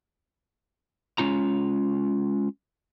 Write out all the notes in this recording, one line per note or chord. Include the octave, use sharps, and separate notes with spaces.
G#3 C#4 F4 A#5